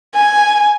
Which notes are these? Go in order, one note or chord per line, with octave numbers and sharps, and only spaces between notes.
G#5